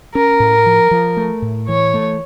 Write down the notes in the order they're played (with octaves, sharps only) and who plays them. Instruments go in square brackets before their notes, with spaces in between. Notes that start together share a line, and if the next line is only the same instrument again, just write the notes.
[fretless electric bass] C#4 [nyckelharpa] A#4
[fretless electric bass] A2
F3
F3
A3
A2
[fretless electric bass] E3 [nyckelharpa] C#5
[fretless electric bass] A3